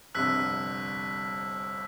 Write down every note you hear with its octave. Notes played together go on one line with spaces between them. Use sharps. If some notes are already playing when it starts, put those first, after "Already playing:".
G1 C2 F2 E6 F#6 B6